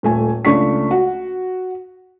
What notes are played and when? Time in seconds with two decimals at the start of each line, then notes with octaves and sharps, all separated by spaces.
0.03 D#1 A3 G#5
0.45 C#2 A3 D4 C#6 B6
0.91 F#4